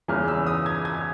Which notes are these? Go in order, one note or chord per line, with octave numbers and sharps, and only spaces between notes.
E2 C#3 E3 F6
E6
D#6
G#6
G#6